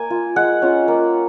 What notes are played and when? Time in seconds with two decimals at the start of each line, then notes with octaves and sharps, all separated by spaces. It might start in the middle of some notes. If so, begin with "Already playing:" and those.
Already playing: A#3 G#5
0.10 F4
0.36 G#3 F#5
0.62 C#4 F4
0.88 A#3